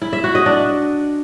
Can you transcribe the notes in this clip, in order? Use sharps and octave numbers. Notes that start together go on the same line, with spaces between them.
E4
E5
F#4
D#5
D4